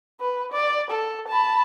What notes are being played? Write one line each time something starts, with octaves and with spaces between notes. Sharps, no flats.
B4
D5
A4
A5 B5